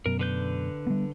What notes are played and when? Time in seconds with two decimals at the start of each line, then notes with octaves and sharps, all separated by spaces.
0.06 F#2 B2 A#4
0.19 D3 B4 G6
0.87 G3 B3